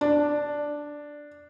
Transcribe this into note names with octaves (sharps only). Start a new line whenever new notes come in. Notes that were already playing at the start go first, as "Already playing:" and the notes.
D4